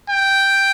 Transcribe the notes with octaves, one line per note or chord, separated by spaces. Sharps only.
G5